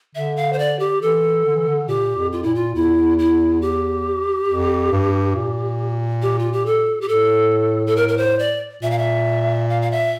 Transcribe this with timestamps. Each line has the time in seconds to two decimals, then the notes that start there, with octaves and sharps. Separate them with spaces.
0.15 D3 E5
0.36 F5
0.53 C5
0.59 D5
0.79 G4
1.02 E3 A4
1.45 D3
1.56 E3
1.67 D3
1.88 A#2 G4
2.17 F2
2.32 F4
2.43 A#2 E4
2.55 F4
2.75 E2 E4
3.19 E4
3.62 G4
4.48 F2
4.92 G2
5.36 A#2
6.22 G4
6.39 F4
6.53 G4
6.66 A4
7.01 G4
7.08 A2 A4
7.87 A4
7.96 A#4
8.08 A#4
8.17 C5
8.39 D5
8.82 A#2 E5
8.91 F5
8.98 E5
9.70 F5
9.82 F5
9.92 E5